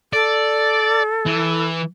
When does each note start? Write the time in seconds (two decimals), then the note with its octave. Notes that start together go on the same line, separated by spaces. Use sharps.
0.13 A4 D5
1.26 E3